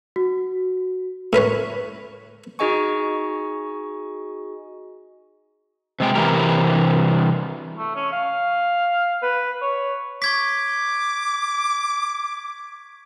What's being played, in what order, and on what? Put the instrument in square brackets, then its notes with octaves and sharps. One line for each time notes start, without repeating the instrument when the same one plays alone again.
[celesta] F#4
[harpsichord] A2 A#4 B4 C#5
[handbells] D#4 F#4 G#4 D#5 G#5 C#6
[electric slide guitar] C3 G#3 G5
C3 E3 E4 G4 A#4
[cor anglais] A3
C#4
F5
B4
C#5
[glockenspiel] C#6 G#6 B6 [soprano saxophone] D6